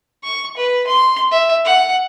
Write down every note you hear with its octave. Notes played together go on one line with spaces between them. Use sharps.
C#6
B4
C6
E5
F#5